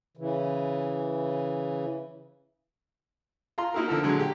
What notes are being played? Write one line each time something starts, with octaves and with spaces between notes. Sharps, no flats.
C#3 E3
F4 F5 A#5 C6
A#3 D#4 E4 F#4 A#4
D3 F3 A4 A#4
A#2 D3 F#3 G#3
G4